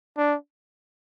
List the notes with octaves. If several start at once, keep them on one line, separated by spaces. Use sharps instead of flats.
D4